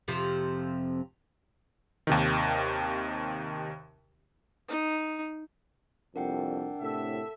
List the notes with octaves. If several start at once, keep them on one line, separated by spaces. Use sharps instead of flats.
F2 C3 F3
D#2 C3 D#3
D#4
C2 F2 D4 A#4 F#5 G5
A2 C3 A4 E5